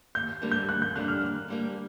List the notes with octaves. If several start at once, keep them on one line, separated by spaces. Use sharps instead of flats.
D#2 G6
D3 G3 A#3
G6
D#2 F#6
G6
D3 G3 A#3 F#6
F6
D#2
D3 G3 A#3